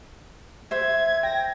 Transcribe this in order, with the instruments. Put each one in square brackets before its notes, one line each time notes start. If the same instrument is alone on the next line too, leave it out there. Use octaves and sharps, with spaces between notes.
[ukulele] C5 E5 [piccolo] G#6
[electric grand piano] G5 [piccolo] A#6